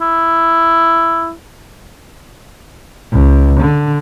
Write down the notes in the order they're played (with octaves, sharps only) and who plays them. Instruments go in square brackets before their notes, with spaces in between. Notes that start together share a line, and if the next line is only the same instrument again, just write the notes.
[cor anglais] E4
[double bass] C#2
D3